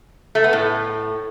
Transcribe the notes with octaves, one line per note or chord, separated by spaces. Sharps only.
A3
B3
A2